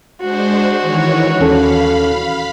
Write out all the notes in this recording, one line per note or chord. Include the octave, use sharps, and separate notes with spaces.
G#3 D4 F#4 C5
D#3 E3 C#5
D#2 C#4 A4 F5 B5